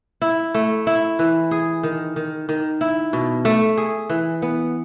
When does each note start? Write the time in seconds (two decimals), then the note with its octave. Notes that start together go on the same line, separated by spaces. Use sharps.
0.22 E4
0.54 A3
0.87 E4
1.19 E3
1.51 G#4
1.83 D#3
2.16 D#3
2.49 D#3
2.81 E4
3.13 B2
3.45 A3
3.77 G#4
4.10 E3
4.42 B3